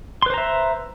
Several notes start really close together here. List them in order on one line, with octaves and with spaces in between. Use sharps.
C6 B4 C5 A#5 E5